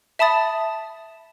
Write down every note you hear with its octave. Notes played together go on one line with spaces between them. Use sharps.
E5 A5 B5 D#6 A6